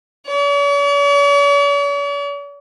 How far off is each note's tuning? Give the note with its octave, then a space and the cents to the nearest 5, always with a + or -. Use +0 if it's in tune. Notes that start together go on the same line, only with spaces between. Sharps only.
C#5 +45